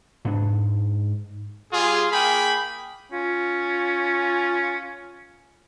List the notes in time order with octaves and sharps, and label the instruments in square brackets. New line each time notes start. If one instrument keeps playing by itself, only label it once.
[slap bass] G#2 D4
[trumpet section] G3 F4 G#4
A#3 G#4 G5 B5
[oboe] C#4 [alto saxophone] F4